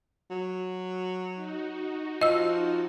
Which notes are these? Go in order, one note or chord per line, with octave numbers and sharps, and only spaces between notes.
F#3
D#4 F#4
F3 D#5 E6